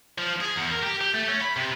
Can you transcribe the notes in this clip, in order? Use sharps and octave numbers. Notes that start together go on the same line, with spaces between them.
F3
G#4
E2
A#4
G4
G4
A3
C#4
B5
C3